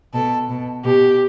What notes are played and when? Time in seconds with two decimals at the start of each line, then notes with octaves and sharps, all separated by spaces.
0.14 B2 A4
0.49 B2
0.85 B2 G4